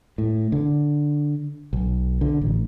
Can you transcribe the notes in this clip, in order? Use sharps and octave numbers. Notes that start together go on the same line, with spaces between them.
A2
D3
B1
D3
A1